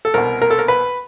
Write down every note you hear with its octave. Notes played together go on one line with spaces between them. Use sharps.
A4
C2 B2 A#4
A#4
A4
A#4
B4